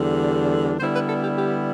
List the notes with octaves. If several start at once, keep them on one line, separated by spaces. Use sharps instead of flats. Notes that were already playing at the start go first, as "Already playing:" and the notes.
Already playing: E2 D3 G3 D4
D3 G3 B3 E4 C5
B4
A4
G4
G4